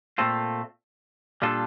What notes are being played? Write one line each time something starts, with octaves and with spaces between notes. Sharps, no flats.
A#2 A3 C4 F4 A4
A#2 G3 D4 F4 A4